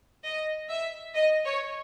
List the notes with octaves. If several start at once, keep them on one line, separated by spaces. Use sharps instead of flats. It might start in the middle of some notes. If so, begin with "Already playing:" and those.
D#5
E5
D#5
C#5